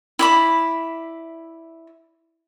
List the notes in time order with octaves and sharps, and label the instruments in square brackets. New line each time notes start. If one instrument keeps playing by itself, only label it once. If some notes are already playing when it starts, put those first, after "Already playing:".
[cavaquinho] E4 D5 B5